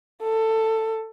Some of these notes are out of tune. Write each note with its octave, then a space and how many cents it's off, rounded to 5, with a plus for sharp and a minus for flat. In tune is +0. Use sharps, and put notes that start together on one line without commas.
A4 +15